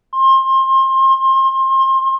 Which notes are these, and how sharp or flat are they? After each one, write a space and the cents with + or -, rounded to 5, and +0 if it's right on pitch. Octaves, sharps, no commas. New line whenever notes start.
C6 +30